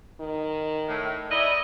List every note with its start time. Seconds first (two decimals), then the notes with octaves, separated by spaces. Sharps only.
0.20 D#3
0.88 A2
1.30 E4 D5 D#5